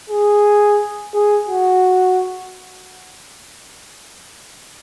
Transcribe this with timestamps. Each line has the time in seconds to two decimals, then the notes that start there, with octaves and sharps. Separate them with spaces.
0.10 G#4
1.14 G#4
1.48 F#4